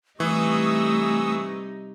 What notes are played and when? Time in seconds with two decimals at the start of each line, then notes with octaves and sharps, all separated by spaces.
0.20 C3 E3 G3 A3 D#4 C#6 D#6 E6